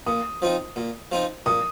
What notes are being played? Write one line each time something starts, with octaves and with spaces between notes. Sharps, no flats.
A#2 D#6
F3 C4 D#4
A#2
F3 C4 D#4
A#2 D#6